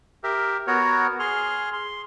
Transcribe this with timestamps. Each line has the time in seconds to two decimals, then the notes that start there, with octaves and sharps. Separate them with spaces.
0.24 G4 A#4 E5
0.67 B3 F#4 A#4 C#5
1.19 G#4 C6 F6
1.73 C6